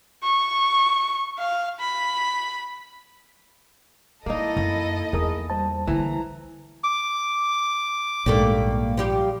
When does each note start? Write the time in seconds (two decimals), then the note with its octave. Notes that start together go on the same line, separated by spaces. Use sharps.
0.23 C#6
1.39 F5
1.80 B5
4.26 G#3 A#3 D#4 E4 A4 D#5
4.57 F#2
5.13 E2 G#4 A#4 D#6
5.50 G3 C5 A5
5.87 D3 E3 A#3 A#5
6.84 D6
8.26 A#1 G#2 G3 A3 A#3
8.97 F3 G3 G4